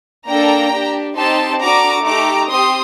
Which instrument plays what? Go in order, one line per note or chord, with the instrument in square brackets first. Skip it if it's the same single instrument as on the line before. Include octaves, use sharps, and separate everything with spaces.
[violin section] A#3 D4 A4 G5 A#5
D4 G4
C4 D#4 G4 A5 C6
D4 F#4 A4 A#5 D6
A3 D#4 G4 A#5 D6
C4 G4 C6 D#6